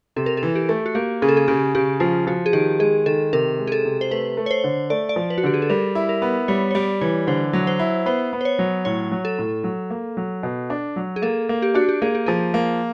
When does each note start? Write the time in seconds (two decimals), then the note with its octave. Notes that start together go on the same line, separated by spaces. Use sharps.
0.16 C3 A4
0.26 A#4
0.37 A4
0.43 E3
0.55 G4
0.69 A3
0.86 F#4
0.95 A#3 G4
1.22 C#3 G#4
1.29 A4
1.37 G#4
1.48 C#3 G4
1.75 C#3 G4
2.00 F3 F4
2.27 F3 F#4
2.46 G#4
2.53 D#3 G4
2.79 G#3 G#4
3.06 D#3 A4
3.33 C3 A#4
3.59 G#3
3.67 G#4
3.72 A4
3.85 C3
4.01 C5
4.11 A3 B4
4.37 A3
4.46 C#5
4.51 C5
4.64 D3
4.90 A3 D5
5.09 D5
5.16 F3
5.30 B4
5.38 F#4
5.43 D3 G4
5.54 G#4
5.62 A4
5.70 G3 A#4
5.95 E4
6.09 A#4
6.22 B3
6.48 G3 C#5
6.71 C#5
6.75 G3 D5
7.01 E3 C#5
7.27 D3 C5
7.53 F#3
7.67 C5
7.79 E4
8.06 B3 C5
8.33 B3
8.41 C5
8.45 C#5
8.59 F#3
8.85 A2 C#5
9.12 F#3
9.25 A4
9.39 A2
9.64 F#3
9.90 A#3
10.17 F#3
10.43 B2
10.70 D4
10.96 F#3
11.16 G#4
11.22 A#3 A4
11.49 A#3
11.62 G4
11.75 D4 F#4
11.89 G4
12.02 A#3 G#4
12.15 G4
12.26 F3 G#4
12.54 A#3